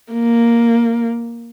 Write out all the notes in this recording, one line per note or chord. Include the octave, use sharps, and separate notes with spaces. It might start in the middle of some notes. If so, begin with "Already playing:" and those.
A#3